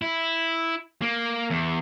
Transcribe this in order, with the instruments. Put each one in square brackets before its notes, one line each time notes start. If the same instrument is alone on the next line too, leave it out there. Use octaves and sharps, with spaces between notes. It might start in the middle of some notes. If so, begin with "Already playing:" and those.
[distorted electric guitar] E4
A#3
E2